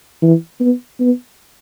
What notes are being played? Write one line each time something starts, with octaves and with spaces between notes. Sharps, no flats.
E3
B3
B3